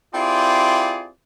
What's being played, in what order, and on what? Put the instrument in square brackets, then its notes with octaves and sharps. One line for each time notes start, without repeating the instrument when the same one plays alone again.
[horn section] C4 E4 F4 G4 G#4 D5